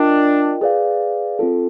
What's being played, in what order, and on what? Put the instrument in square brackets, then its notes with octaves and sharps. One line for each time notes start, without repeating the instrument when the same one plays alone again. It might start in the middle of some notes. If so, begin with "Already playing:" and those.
Already playing: [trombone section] D4 [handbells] F4 A#4 D#5 G5
[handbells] G#4 B4 D5 F5
C4 F4 A4